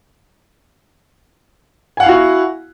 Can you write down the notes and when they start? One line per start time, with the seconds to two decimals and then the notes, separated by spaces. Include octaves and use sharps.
1.97 G#5
2.00 F#5
2.03 F5
2.06 E4
2.08 F#4